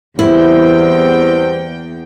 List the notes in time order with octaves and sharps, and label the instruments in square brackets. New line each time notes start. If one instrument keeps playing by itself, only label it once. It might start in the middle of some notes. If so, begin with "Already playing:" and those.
[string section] E2 G5 [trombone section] G3 B3 C4 [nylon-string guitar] E4